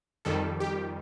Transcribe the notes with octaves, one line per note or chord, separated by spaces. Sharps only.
F2 D#3 G3 A4
G4